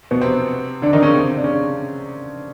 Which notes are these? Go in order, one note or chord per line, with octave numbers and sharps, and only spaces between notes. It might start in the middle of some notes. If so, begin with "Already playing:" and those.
B2 B3
C3 C4
D3 D4
D#3 D#4
C#3 C#4
C3 C4
D4
C#3 C#4